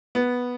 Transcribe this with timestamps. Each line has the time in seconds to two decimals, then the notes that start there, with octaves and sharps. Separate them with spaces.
0.15 B3